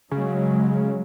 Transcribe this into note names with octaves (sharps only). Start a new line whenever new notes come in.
C#3 F#3 G#3